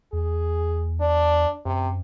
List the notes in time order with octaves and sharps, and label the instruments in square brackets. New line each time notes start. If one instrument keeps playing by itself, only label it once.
[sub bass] E2 [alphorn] G#4
[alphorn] D4
[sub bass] F#2 [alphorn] C3